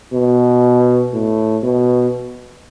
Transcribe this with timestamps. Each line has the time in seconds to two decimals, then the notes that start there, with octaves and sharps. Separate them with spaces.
0.13 B2
1.13 A2
1.63 B2